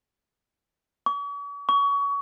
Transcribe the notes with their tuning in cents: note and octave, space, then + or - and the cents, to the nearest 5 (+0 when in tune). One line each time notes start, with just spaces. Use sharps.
C#6 +45
C#6 +30